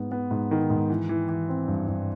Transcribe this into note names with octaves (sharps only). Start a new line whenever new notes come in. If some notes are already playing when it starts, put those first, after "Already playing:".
Already playing: G#2 B3
B3
G#2
D#3
G#2
E3
E3
E3
C4
G2
G2